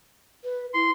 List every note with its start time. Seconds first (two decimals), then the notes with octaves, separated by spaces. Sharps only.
0.44 B4
0.74 E4 C6